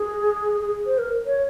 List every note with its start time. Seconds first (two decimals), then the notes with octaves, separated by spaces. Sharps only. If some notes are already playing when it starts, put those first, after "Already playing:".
Already playing: G#4
0.61 G#4
0.86 C5
0.98 A#4
1.25 C#5